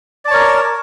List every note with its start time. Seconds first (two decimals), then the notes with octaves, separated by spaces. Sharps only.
0.25 D5
0.28 A5
0.31 C#5
0.34 A#4